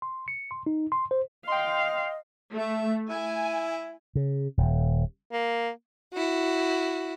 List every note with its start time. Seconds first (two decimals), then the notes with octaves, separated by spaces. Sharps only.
0.02 C6
0.28 C#7
0.51 C6
0.66 D#4
0.92 C6
1.11 C5
1.47 D#5 F5 G5 C6
2.54 A3 E5
3.09 E4 G#5
4.15 C#3
4.58 D#1
5.32 A#3
6.13 E4 F#4